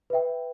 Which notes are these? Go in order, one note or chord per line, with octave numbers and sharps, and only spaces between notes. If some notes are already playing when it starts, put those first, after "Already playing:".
B4 E5 G5